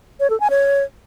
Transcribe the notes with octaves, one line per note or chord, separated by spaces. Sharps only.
C#5
A4
G#5
C#5